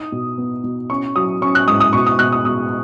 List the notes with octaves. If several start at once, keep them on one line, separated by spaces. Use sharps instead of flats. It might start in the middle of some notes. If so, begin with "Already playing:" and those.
Already playing: D#4 D#6
B2
B3
B2
C#4 C#6
F#3 D#6
C#4 C#6
F#6
G#2 D#6
D#6
B2 C#6
D#6
B2 F#6
D#6
B2 D#6